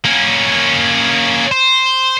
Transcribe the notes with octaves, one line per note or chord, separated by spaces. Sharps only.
A#3 C#4
C5